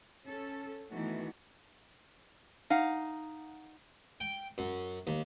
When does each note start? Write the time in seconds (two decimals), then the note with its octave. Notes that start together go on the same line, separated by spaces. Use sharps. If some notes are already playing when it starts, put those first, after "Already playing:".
0.24 C#4 A4
0.92 D#3 E3 A3 B3 F#4
2.70 D#4 F5 F#5
4.20 G5
4.58 F#2
5.07 D#2